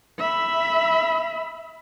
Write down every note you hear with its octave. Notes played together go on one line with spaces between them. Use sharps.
E5 B5